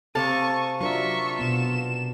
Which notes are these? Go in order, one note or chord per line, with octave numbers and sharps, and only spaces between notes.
C3 A4 F5 A5 C#6 D#6
F#3 D4 F4 A#4 E5 C#6
B2 B3 E7